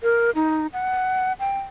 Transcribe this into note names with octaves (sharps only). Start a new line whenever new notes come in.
A#4
D#4
F#5
G5